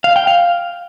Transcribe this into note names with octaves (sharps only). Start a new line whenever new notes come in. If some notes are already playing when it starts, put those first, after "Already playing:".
F5
G5
F5